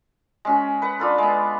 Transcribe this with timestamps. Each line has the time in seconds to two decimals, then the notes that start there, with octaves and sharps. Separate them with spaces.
0.45 G#3 C#4 F#4
0.82 B4 F#5
1.00 D4 F4 A4
1.18 G#3 B3